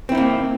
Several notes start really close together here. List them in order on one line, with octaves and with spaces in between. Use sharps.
C4 E4 D#4 A#3